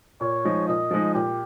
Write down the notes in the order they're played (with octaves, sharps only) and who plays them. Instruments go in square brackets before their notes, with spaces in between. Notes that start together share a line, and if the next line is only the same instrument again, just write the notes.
[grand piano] A#2 [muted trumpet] C#5
[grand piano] F3 G#3 D#4
[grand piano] A#2 [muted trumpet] D#5
[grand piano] F3 G#3 D#4
[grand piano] A#2 [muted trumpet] G4